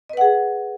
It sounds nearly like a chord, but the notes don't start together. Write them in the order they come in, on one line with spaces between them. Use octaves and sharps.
D#5 B4 F#5 G#4